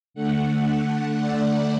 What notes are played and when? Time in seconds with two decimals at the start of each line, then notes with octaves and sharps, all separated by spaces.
0.14 D3 A3 F#5
1.18 D5